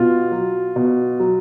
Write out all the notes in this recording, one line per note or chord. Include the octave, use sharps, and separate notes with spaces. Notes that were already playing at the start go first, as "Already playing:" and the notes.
Already playing: B2 F4
F#3
B2
F#3